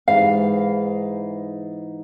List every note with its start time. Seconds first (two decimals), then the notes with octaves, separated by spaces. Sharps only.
0.08 G#2 E3 D#4 F5